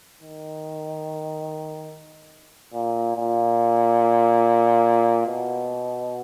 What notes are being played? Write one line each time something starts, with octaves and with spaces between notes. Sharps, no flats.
D#3
A#2
A#2
B2